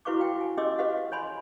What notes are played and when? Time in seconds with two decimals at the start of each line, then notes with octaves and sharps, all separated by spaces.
0.05 E4 F#4 B4 F5 C#6 D6
0.19 F#4 F5 G5
0.41 G#5
0.57 C#4 G4 D#5 C6 D6 E6
0.78 G4 B4 D#5 F5 F#5
1.12 C#5 G#5 B5 C6